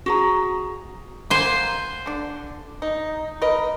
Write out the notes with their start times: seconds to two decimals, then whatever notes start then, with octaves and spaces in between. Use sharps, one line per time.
0.06 F#4 G#4 A#5
1.30 A#3 C5 F#5 G#5
2.06 D3 D4
2.82 D#4
3.42 A#4 B4 D#5